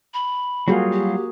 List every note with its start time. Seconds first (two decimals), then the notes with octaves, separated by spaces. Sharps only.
0.14 B5
0.68 F#3 G3 A#3 F4 F#4 G#4
0.93 G4